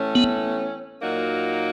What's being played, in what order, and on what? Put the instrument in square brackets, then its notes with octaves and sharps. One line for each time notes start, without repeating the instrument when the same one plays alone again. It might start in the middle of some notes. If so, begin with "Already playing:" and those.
Already playing: [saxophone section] A2 E3 A3 C#4
[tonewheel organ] B3
[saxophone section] A#2 F#3 A#3 D#4 F#4